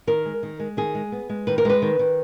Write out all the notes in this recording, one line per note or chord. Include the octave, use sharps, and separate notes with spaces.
D#3 A#4
G#3
D#3
G#3
D#3 G#4
G#3
B3
G#3
D#3 B4
A#4
G#3 B4
D#3
D#3